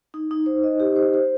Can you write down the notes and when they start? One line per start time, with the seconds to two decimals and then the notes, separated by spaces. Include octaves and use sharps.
0.14 D#4
0.31 D#4
0.46 C5
0.64 D#5
0.80 G4
0.96 C5
1.14 C5